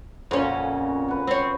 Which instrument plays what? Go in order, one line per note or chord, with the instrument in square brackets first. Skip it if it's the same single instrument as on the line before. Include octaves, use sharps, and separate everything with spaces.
[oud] F2 C#4 [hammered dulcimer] A#2 C#3 F#4
[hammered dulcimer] B4 F#5
[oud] C4 C#5